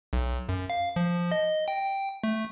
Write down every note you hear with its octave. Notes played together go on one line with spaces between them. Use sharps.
B1
F#2
F5
F3
D#5
G5
A3